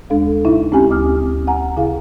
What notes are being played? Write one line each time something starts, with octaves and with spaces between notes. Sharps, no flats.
D#2 G#3 D4 A4 F5
C#3 D#4 E4 E5
G#3 C4 C#4 G4 G#5
D2 D6 D#6 F6
F#5 G#5 A#5
C#3 E4 G#4 F5